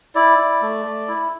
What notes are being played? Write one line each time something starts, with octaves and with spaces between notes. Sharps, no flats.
E4 D5
E4
A3
A3
E4